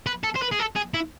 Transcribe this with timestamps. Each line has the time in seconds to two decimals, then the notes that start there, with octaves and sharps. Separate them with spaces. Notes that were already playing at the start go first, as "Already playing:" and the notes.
0.06 B4
0.23 A4
0.35 C5
0.42 B4
0.51 G#4
0.59 A4
0.76 G#4
0.94 E4